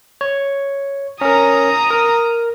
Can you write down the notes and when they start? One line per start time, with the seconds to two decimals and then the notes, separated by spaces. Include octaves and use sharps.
0.21 C#5
1.21 C#4 A#4 A#5 D#6
1.90 A#4